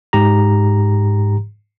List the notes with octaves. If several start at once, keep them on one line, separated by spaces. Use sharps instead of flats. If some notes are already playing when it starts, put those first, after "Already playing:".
G#2 G4 A#5